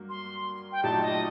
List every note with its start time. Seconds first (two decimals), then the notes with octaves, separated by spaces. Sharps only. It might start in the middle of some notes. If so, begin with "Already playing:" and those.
Already playing: G2 F#3 A#3
0.09 C6
0.72 G5
0.83 A#2 F#3 A3 D#4 G4 A5
1.02 D#5